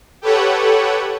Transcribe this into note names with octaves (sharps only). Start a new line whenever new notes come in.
G4 A4 B4 C#5 F#5